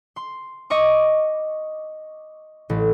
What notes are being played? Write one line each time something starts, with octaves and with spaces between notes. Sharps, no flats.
C6
D#5 C#6 D6
A1